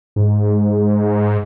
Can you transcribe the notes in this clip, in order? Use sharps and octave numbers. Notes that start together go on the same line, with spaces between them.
G#2